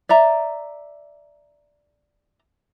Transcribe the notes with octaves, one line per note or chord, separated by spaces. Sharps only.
D5 E5 A#5